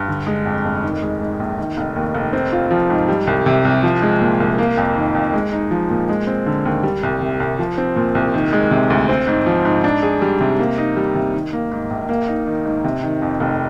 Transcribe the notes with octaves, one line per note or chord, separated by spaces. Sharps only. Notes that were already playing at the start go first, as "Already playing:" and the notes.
Already playing: G2
D3
G#3
F2
F1
D#3
G#3
G#2
A#1
D#3
F1
D#2
F1
C4
F4
F3
G#2
G3
C2
C3
C2
F3
G#3
A#2
C2
A#3
F2
D#3
F2
G#3
D#4
F3
A#2
G#3
C4
D3
D#2
G3
C2
C3
C2
F3
C4
A#2
C2
D#3
G#3
C3
D2
C4
G#2
F3
G#2
D4
G#4
G3
C3
A#3
D#4
G3
C3
D#3
A#3
G#2
A#1
A#3
D#4
D#3
G#2
C3
D#3
F2
F1